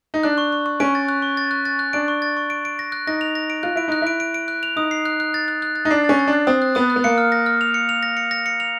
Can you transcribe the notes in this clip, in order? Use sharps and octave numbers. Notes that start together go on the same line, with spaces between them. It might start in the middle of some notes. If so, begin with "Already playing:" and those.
D#4
D4 F#6
C#6
C#6
C#6
C#4 D7
A6
F#6
C#6
A6
F#6
A6
F#6
D4 D7
C#6
A6
C#6
D7
D7
A#6
F#6
D#4 A#6
F7
A#6
D7
F4 F#6
E4 D7
D#4 F#6
E4 D7
D7
D7
F#6
F7
D#4 D#6
C7
F#6
F#6
A6
F#6
F#6
A6
D#4
D4 C7
C#4 A6
A6
D4
F#6
C4 D#6
F#6
B3 D#6
F#6
B3
A#3 C#7
F6
A#6
F6
F7
C#7
F7
A#6
C#7
A#6
C#7
F7